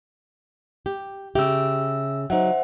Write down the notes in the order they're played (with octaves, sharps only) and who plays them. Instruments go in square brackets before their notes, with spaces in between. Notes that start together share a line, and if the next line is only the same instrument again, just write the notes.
[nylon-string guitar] G4
[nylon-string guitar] C#3 G4 [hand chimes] E5 E6
[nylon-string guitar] F#3 D#4 [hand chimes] C5 E5 F#5